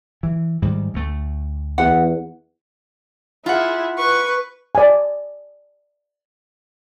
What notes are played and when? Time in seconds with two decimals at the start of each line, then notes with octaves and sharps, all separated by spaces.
0.23 E3
0.62 G#2 D#3 G3
0.94 D2 A3
1.78 E2 F#5
3.46 E4 F4 G#4 F#5
3.98 B4 C#6
4.75 D5 G#5